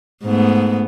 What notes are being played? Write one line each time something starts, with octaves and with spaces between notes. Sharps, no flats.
G#2 A3 B3